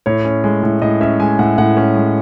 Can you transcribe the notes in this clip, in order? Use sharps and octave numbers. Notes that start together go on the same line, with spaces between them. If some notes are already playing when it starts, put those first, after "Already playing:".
A2 C#5
C#4
G#3
A2
A2 D#5
C#4 E5
G#3 G#5
A2 F#5
A2 F#5
C#4
G#3